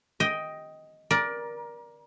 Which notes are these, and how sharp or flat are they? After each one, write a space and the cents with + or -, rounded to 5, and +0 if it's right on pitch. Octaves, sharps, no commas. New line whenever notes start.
D#5 +10 G5 +0
A#4 +25 D5 +0